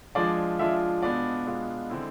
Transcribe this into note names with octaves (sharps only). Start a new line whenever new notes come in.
F3 G#3 D4 F4 D5
F3 G#3 D4 F4 E5
B2 G#3 B3 D4 F4 D5
B2 G#3 B3 D4 F4
D3 G#3 C4 E4